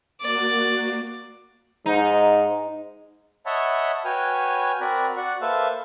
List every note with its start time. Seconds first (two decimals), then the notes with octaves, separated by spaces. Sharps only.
0.21 A#3 F#4 D5
1.86 G#2 D#4
3.46 C#5 D#5 E5 F#5 A5 B5
4.05 F#4 B4 C#5 G5 G#5 F6
4.81 C4 F#4 A#4 D5 A#5 B5
5.16 F#4 D5 F#5
5.41 A#3 A4 B4 C5 E5 F5